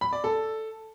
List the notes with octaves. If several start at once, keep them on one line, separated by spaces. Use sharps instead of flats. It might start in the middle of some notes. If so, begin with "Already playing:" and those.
B5
D5
A4